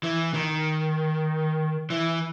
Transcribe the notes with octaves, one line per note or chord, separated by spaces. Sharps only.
E3
D#3
E3